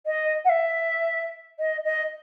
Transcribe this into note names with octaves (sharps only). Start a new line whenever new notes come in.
D#5
F#5
E5
D#5
D#5